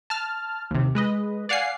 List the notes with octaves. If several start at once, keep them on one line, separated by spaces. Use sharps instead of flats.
A5 F6
D#2 C3
G#3 B4 D#5
D5 F5 F#5 G#5 C7